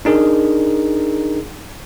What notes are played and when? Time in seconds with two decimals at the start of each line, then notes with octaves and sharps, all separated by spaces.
0.05 D4 D#4 G#4 A#4